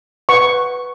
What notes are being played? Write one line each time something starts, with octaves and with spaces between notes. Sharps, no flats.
B4 F#5 C#6